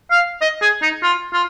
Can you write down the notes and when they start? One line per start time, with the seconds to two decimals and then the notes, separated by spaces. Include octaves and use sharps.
0.11 F5
0.41 D#5
0.62 G#4
0.82 D#4
1.03 F4
1.33 F4